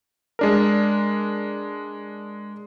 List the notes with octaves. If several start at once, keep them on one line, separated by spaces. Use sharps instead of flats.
G#3 D4 A#4